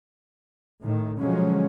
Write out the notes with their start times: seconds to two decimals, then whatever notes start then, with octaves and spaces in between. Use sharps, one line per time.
0.83 A2 D#3
1.20 B2 D3 F3 F#3 G#3 C#4